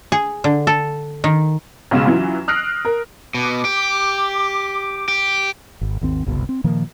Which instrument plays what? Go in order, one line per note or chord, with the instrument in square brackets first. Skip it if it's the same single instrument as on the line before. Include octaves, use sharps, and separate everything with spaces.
[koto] G#4
D3
A4
D#3
[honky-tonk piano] B1 C#3 G#3 E7
E3 F#3 C#4 F4
D#6 F6 F#6 A#6 C7 D7
A#4
[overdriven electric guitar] B2 [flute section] D6
[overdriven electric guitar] G4
G4
[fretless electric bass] G#1
G#1 D#2 C4
F#1 C2 B2
C4
A#2 D#3 F3 A#3